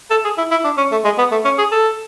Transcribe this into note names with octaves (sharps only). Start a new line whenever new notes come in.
A4
G#4
E4
E4
D4
C#4
A3
G#3
B3
A3
C#4
G#4
A4